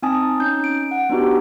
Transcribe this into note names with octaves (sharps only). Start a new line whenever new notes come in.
C4 D#4 G#5 A5 D#6
C#4 D#4 G6
D7
F#5
B3 D4 D#4 F#4 G4